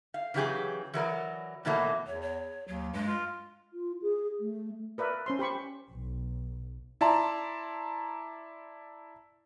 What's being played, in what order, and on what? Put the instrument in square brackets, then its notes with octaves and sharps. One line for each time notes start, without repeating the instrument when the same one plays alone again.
[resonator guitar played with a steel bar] F5
C#3 E3 F#3 G4 G#4
E3 F#3 A#4 D5
B2 E3 F#3 A3 A#3
[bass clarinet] E2 [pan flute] C#5
[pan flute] C#5
[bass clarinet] D#2 [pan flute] F#3
[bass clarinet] G2 [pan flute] G#3
[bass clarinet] F4
[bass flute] F4
G#4
A3
[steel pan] A#4 B4 D5 E5
C#4 C5 C6
G4 C5 B5 C#6
[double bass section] B1
[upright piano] E4 D5 A5 A#5 C6